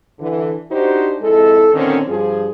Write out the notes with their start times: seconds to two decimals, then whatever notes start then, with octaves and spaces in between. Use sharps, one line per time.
0.20 D3 E3
0.71 D4 D#4 F#4 G4 C5
1.22 F2 G#2 G#3 E4 A4
1.74 A#2 D3 D#3 C4 C#4
2.08 G2 F3 G#4